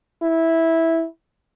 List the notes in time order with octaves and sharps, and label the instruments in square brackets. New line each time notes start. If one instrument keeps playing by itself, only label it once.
[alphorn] E4